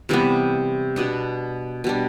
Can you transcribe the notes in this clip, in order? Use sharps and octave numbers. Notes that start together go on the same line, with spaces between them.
C3 E3 G3 B3
B2 B3 D4
B2 G3 D4